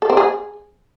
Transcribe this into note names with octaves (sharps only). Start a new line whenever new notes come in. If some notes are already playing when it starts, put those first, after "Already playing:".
A4
C4
G#4